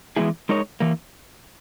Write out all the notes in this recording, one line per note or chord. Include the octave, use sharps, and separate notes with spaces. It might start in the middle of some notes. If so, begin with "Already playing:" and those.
E3 G#3 B3 E4 G#4
G#3 D#4 A#4 C#5
E3 A#3